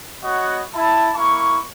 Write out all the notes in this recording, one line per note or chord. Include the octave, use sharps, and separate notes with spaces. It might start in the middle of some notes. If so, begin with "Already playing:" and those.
B3 F#4 C#5 D#5 F#5
E4 A5
A#3 E4 C#6